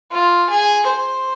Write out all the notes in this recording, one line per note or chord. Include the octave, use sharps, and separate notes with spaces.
F4
G#4
C5